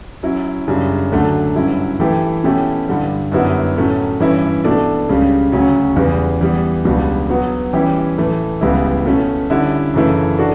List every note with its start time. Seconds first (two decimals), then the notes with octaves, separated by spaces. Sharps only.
0.23 F#3 C#4 E4
0.68 F#2 C#3 G3 D4
1.12 D2 D3 F#3 A3 D4
1.56 G2 F#3 C#4 E4
2.00 E3 A3 E4 G4
2.44 B2 A3 C#4 E4 G4
2.88 G2 D3 G3
3.32 F#2 D3 G3 B3 E4
3.77 A2 F#3 A3 C#4
4.20 G2 E3 G3 C#4 E4
4.64 B2 A3 D4 A4 D5
5.09 C#2 C#3 G3 C#4
5.52 D2 C#3 F#3 C#4
5.96 E2 C#3 G3 B3
6.41 E3 G3 B3
6.85 C#2 B2 G3 D4
7.29 F#3 B3 F#4
7.73 E3 G3 C#4 E4 G4
8.18 A2 E3 A3
8.61 C#2 C#3 G3 B3 E4
9.06 B2 A3 C#4
9.50 D3 G3 C#4 E4
9.94 F#2 C#3 E3 A3 E4
10.38 D4 F#4 A4